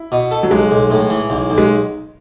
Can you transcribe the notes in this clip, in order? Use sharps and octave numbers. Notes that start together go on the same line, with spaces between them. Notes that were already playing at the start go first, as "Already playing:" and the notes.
Already playing: E4
B2
A4
F#3
B1 G#3
B1
A2
E3
B1
B1
G#3